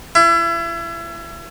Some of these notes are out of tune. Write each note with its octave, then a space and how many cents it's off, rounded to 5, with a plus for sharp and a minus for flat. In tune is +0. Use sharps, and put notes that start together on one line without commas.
E4 +35